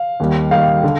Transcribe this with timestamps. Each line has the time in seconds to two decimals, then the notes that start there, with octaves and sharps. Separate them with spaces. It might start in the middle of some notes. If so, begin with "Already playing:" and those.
Already playing: F5
0.20 D#2 D#3 G3
0.51 D#2 D#3 G3 F5
0.84 D3